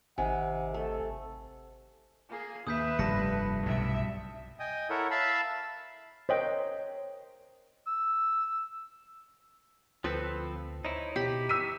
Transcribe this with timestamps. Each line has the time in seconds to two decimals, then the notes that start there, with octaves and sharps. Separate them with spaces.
0.18 G#1 C3 D#3 F#5 G#5
0.74 A3 A4
2.29 A#3 G#4
2.67 D#2 B4 E5 D#6 G6 B6
2.99 F1 G2 A5 A#6 C#7
3.66 B1 A2 C3 E5
4.60 D#5 G5 G#5 D#6
4.90 E4 A4 A#4 C#5 E5 F#5
5.11 E5 F5 A5 B5 E6
6.29 A#4 C5 C#5 D#5 G5
7.87 E6
10.04 D2 F3 C4 A4 B4
10.85 D#4 E4 C5 C#5
11.16 B2 G4 B5
11.49 C#6 E6 B6 D#7